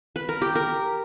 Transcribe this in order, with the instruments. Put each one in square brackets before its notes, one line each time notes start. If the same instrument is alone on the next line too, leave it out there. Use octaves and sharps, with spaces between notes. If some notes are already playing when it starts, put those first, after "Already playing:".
[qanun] B4
A#4
G4
A#4